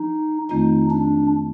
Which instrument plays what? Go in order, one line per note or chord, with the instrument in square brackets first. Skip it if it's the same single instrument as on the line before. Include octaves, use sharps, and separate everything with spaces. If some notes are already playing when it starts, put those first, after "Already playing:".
Already playing: [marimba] F3 [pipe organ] D#4
[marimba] F2 D#3 A3 C4 F4 [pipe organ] D#4
[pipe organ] D4